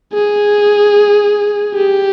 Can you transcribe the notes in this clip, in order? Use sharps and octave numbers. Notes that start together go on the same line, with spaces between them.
G#4
G4